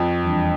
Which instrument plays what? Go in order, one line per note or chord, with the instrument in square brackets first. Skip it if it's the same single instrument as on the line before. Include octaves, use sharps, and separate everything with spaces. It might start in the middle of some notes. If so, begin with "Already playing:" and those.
Already playing: [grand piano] F2
[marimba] E2 E3 G3 D4